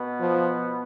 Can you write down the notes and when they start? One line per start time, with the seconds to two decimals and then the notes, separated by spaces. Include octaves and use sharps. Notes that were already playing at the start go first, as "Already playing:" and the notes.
Already playing: B2 B3
0.20 F3